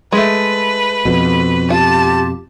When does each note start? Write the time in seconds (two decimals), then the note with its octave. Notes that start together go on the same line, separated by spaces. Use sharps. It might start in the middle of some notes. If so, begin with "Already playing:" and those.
0.12 G#3 A3 B4
1.05 F2 B2
1.70 F4 G4 A5